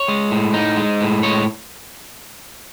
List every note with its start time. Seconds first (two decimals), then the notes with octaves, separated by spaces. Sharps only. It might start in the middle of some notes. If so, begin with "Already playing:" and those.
Already playing: C#5
0.08 G#3
0.31 A2
0.54 D#4
0.77 G#3
1.01 A2
1.23 G#3 C#5